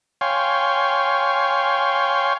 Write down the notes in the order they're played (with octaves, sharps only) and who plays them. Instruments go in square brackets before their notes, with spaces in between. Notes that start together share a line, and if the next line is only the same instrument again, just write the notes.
[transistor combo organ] C#5 F5 G5 G#5 C6